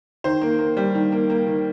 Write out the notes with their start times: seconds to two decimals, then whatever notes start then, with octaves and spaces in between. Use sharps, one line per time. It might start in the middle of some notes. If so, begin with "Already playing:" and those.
0.24 D#3 C5
0.42 A#3
0.59 A#3
0.77 G3
0.95 D#3
1.12 A#3
1.30 A#3
1.47 D#3